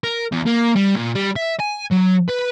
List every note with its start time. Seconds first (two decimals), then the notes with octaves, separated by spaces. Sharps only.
0.04 A#4
0.32 E2
0.46 A#3
0.76 G3
0.95 A#2
1.15 G3
1.36 E5
1.60 G#5
1.91 F#3
2.28 B4